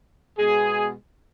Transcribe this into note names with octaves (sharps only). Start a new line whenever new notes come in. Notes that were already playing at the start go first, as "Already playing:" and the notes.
B2 G#3 B3 G#4